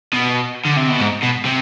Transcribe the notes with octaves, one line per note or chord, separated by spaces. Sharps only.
B2
D3
C3
B2
G#2
B2
C3